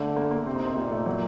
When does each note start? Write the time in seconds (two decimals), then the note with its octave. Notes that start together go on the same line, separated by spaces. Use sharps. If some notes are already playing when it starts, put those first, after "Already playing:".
Already playing: D3 A3
0.16 A#3
0.31 A#3
0.46 C3 C4
0.56 D#4
0.66 C4
0.77 A#2 A#3
0.91 A3
1.06 F#3